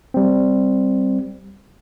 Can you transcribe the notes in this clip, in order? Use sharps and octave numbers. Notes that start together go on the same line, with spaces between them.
G3 C4